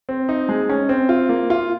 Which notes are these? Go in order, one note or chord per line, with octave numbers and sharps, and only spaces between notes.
C4
D#4
G#3
C#4
C4
F4
A#3
F4